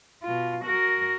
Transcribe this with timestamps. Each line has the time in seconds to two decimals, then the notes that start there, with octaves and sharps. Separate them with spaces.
0.24 B2 F4
0.65 F#4 A#4